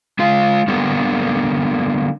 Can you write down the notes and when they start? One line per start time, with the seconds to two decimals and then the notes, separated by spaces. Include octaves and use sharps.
0.19 G#3 F4 F5
0.68 D3 G3 A#3 B3